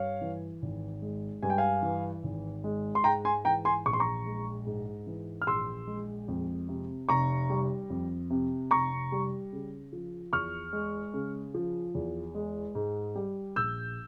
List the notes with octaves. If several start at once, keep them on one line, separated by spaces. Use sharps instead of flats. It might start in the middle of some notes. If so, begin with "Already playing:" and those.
Already playing: G2 C#5 F5
E3
G#1
G#3
G2 G#5
G5
F5 G#5
E3
G#1
G#3
C6
G#2 G5 A#5
G#5 C6
E3 G5 A#5
G#5 C6
A#1 C#6
C6
A#5 C#6
G#3
G#2
E3
F6
A#1 C6 E6
G#3
F2
C3
F1 A#5 C#6
G3
F2
C3
F1 A#5 C#6
G3
C#3
F3
E2 C#6 F6
G#3
C#3
F3
E2
G#3
G#2
G3
A#1 E6 G6